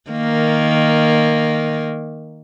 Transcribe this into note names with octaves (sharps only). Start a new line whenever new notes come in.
D#3 A#3